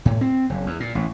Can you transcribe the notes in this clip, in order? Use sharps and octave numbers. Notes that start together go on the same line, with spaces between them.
A2
C4
F#1
E2
A#2
A1